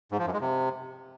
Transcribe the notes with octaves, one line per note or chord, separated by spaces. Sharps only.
G#2
F3
F#2
G#3
C3